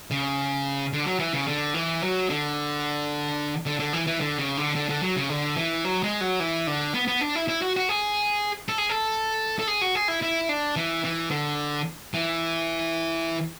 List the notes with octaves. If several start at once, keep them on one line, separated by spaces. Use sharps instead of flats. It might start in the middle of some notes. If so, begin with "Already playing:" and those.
C#3
D3
F#3
E3
C#3
D3
E3
F#3
D3
D3
D3
E3
E3
D3
C#3
D3
D3
D3
F#3
C#3
D3
E3
F#3
G#3
F#3
E3
D3
B3
B3
D4
E4
E4
F#4
F#4
G#4
A4
G#4
A4
A4
G#4
F#4
G#4
E4
E4
D4
E3
E3
D3
E3